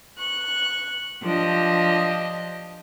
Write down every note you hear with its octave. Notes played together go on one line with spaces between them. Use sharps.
C#6 F#6
F3 D4 G4 D#5